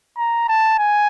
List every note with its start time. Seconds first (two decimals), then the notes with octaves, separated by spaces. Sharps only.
0.18 A#5
0.48 A5
0.79 G#5